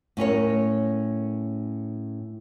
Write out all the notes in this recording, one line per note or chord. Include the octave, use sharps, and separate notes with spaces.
A2 C#4 A#4 C#5